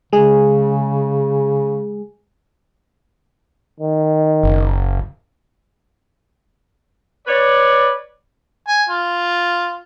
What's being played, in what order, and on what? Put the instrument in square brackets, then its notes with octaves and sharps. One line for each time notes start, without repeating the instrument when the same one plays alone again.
[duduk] C#3 [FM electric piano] G#3 G#4
[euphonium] D#3
[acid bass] F#1
[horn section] B4 C#5 D5
[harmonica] G#5
F4